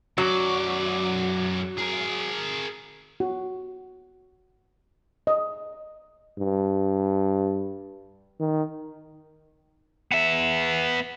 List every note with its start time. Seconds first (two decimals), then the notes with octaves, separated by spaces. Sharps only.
0.18 F#2 F#3 D5
1.78 G#4 A#4
3.20 F#4
5.27 D#5
6.39 G2
8.40 D#3
10.12 B3 E5